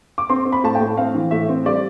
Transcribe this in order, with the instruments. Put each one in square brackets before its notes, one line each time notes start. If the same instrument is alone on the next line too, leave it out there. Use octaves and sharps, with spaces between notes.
[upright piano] D6
C4 C6
C4
B5
A2 A5
G5
A2
C4 F5
E3
A2 E5
C4
G3 D5